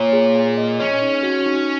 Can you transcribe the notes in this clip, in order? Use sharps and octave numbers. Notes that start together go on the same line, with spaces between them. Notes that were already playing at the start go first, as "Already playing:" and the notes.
Already playing: A#2 C#5
G#4
G#4
D#5
C#4 C#5
D#4
F#4
D#4